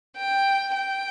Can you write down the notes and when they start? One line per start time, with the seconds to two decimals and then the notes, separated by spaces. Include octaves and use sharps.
0.17 G5
0.76 G5